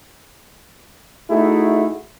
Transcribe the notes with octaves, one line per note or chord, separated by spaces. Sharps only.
A3 D#4 E4 F#4 G#4